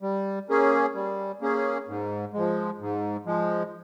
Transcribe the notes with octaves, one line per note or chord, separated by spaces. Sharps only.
G3
A#3 C#4 G#4
G3
A#3 C#4 G#4
G#2
F3 G#3
G#2
F3 G#3